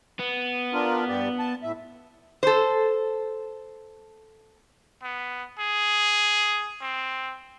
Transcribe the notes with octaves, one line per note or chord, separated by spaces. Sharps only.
B3
D4 F4 A#4
G2 G4 D5
A5
A2 E5
A4 C5
B3
G#4
C4